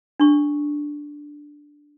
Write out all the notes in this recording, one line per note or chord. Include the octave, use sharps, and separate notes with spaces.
D4 C#6